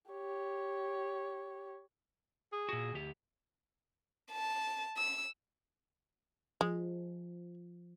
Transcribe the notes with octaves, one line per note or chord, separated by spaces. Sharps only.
G4 C#5
G#4
A#2 F#4
D2 G4
A5
E6
F3 G#3